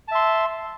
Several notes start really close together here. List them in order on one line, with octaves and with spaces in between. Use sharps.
A5 E5 C6